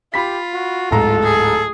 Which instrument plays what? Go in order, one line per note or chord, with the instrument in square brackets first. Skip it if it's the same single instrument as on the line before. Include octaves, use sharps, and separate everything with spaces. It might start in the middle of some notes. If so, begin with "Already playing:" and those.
[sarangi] F4 [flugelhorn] G4 [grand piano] B5 B6
[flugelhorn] F#4
[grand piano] D1 G#2 A#5 [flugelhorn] A4
[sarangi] G#4